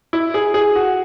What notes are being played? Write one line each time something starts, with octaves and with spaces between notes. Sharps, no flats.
E4
G#4
G#4
F#4